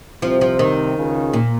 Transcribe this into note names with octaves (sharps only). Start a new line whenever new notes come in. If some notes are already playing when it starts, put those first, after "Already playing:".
C2 C3 F3
F3
D#3
C#2 C#3
A#2